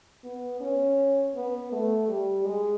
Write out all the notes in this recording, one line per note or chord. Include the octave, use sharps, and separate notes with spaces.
B3
C#4
B3
A3
G3
G#3